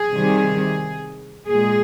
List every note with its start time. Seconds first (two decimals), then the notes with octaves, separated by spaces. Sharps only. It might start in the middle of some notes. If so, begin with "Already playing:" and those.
Already playing: G#4
0.13 C3 D#3 G3
1.48 A#2 G#3 G#4